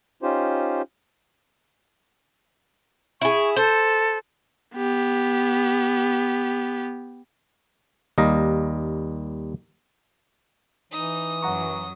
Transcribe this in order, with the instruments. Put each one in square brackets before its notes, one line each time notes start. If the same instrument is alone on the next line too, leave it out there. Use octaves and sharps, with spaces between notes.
[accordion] C#4 D#4 F4 G4 C5
[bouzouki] E4 G#4 [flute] C#6
[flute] A4 [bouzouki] C5
[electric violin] B3 G4
[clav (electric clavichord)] D#2 G3 D#5 F5 A#5
[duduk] E3 [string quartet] D#4 [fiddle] D#6
[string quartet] F#2 F#3 [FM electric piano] F#5 A#5 C#6